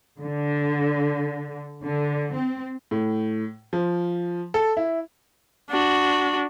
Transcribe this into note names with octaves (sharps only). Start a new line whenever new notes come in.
D3
D3
C4
A2
F3
A4
E4
D4 F#4